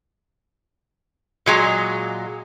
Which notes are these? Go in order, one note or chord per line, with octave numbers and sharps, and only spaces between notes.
A#2 F#3 G#3